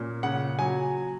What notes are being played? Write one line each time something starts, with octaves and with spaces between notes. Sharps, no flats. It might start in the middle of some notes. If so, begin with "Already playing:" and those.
Already playing: A#2 C#4
C#3 F#5
F#3 G#5